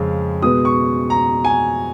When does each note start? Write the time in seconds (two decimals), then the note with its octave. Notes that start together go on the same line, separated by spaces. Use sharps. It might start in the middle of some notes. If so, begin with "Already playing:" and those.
Already playing: F2 C#3 F3 G#3
0.42 B2 G#3 B3 D#6
0.65 C#6
1.10 A#5
1.45 G#5